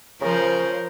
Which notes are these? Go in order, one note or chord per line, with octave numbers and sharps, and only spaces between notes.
C#3 F3 A#4 C5